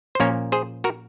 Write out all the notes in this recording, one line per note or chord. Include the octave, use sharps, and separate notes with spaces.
C5
A#2 F3 A#3 C#4 A#4 C#5
G#4 C5
F#4 A#4